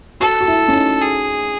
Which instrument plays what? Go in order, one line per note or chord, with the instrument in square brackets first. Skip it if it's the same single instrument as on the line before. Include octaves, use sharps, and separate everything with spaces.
[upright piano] F#4 [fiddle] A4
[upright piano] F#4
E4
C#4
D#4
[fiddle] G#4